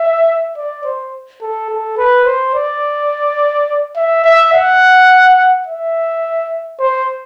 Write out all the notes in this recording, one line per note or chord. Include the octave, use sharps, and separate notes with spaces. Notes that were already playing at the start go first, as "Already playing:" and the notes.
Already playing: E5
D5
C5
A4
A4
B4
C5
D5
E5
E5
F#5
E5
C5